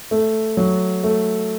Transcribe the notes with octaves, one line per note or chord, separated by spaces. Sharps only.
A3
F#3
A3